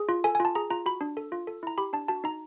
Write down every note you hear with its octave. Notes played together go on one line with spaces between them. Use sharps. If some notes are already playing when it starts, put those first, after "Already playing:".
Already playing: G#4
F4
A4 G#5
G#5
F4 A5
G#4 A#5
F4 A#5
F#4 B5
D4
A4
F4
A4
E4 A#5
G4 B5
D4 A5
F#4 A5
D#4 A#5